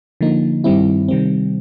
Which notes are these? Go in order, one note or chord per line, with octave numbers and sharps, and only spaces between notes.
D3 F3 A#3 D#4
G2 D#3 G3 C4 E4
C3 D#3 G3 C4